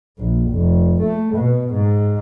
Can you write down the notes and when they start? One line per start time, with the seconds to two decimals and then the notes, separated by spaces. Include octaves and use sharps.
0.18 A#1
0.50 F1
1.02 A3
1.36 B2
1.74 G#2